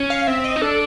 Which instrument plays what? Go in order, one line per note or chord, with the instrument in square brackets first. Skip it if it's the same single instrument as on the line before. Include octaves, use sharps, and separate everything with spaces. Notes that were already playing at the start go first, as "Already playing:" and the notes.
Already playing: [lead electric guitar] C#4
[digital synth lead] F5
[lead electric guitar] C4 [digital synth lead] E5
[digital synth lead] D#5
[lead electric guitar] D#4
[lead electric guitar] D4 [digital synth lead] A4